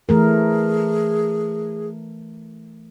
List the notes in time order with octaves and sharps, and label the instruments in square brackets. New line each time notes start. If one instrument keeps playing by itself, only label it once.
[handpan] E3 A3 A#4 [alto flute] G#4